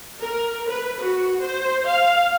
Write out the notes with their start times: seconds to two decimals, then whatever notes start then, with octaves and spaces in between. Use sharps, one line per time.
0.20 A#4
0.69 B4
1.02 F#4
1.42 C5
1.87 F5